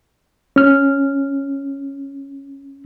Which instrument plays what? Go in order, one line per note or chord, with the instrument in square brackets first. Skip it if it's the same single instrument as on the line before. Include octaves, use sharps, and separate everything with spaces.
[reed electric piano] C#4 F6